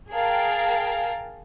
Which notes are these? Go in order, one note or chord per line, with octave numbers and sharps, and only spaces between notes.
G#4 A#4 F5 G5 A5